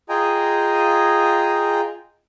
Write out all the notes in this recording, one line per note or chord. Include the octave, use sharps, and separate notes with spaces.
F4 G#4 D#5 G5 G#5 A#5